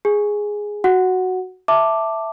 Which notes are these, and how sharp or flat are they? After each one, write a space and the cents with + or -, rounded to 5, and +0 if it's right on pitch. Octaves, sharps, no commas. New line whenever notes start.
G#4 +0 G#5 +0
F#4 +0 F#5 +0
E5 +0 A5 +10 D6 +0